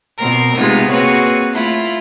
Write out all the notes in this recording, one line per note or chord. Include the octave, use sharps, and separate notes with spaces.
B2 C4 A#4
C3 G#3 A3 B3 D#4 F4
A#3 C4 F#4 G#4 B4 C#5
A3 E4 F4